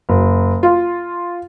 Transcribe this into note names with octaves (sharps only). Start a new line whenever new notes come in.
F#1
F4